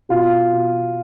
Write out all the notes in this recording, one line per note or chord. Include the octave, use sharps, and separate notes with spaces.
B2 F4
B2